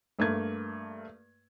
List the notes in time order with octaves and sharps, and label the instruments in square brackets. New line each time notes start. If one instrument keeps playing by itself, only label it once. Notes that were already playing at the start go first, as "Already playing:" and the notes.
[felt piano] G2 A3 A#3 G#6